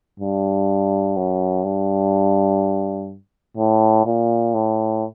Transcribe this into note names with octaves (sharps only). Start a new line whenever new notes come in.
G2
F#2
G2
A2
A#2
A2